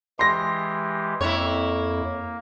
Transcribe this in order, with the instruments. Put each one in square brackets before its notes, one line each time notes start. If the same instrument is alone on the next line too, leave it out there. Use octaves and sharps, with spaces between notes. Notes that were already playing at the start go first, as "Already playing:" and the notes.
[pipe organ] E3 G#3 G4 [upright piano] C6 A#6
[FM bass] F2 [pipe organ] A#3 [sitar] E4 C#5